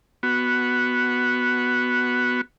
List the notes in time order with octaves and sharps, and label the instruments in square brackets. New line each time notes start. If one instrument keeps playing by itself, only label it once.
[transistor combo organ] B3 F#4